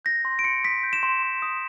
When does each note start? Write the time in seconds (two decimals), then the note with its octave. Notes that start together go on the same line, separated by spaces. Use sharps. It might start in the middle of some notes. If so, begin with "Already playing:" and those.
0.05 G6 A#6
0.25 C6
0.39 D7
0.44 C6 C#7
0.64 D#6 B6
0.83 G6
0.93 E7
1.03 C6
1.23 C6
1.42 D#6